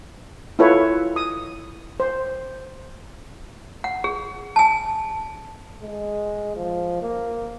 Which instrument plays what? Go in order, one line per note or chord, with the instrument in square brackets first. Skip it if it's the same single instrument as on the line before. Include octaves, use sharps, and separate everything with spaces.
[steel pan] E4 F4 A4 B4 C#5
D#6
C5
[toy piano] F#5
G#4
G#5 A5
[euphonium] G#3
F3
A#3